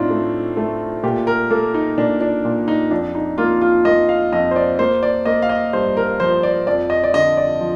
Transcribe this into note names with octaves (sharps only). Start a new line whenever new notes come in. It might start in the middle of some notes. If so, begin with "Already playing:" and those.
Already playing: A2 C4 D4 D#4 F4
A3
A3
A#2 G4
A#4
A#3 A4
D#4
A#2 D4
D4
A#2
D#4
F2 D4
D#4
A#3 F4
F4
A#3 D#5
F5
F2 D#5
C5
D5
A#3 C5
D5
A#3 D#5
F5
D#5
G2 C5
A#4
F3 C5
D5
F2 D5
D#5
D5
D3 D#5
D5
F3